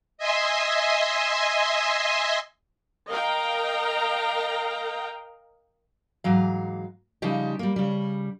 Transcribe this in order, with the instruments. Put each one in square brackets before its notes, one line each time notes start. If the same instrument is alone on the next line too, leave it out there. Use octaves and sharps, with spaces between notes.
[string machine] D#5 E5 G#5 C6
[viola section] A#4 D#5 F5 G5 A#5
[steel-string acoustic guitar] G#2 E3 F#3 F5
C#3 F3 G3 D#4 G4
G3 A#3
C#3 G3